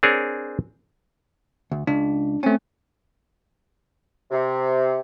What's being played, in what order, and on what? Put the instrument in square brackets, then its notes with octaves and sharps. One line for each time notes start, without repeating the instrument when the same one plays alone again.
[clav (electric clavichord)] C4 D4 G#4 A#4 C#5
[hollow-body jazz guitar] D2
[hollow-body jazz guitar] C#2 [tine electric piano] D4
[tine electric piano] A3 C4 [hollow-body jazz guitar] C#4
[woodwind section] C3